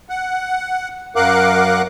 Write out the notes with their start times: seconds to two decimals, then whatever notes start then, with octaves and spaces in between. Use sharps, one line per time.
0.09 F#5
1.16 F#2 A#4 F5 F#5 D6 F#6